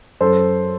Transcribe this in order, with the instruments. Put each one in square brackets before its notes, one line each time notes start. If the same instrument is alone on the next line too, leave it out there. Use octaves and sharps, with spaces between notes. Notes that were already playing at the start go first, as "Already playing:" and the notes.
[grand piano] F#2 A4 C5